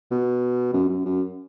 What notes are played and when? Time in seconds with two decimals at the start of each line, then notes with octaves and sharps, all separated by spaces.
0.11 B2
0.73 F#2
0.89 F#2
1.05 F#2